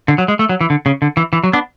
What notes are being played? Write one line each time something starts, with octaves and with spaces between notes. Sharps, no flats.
D3
F#3
G#3
A3
F#3
E3
D3
C#3
D3
E3
E3
F#3
B3 D4